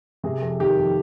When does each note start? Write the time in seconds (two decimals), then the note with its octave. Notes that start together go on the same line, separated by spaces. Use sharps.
0.24 C3 G#4
0.41 F2
0.60 D#3 G4
0.77 F2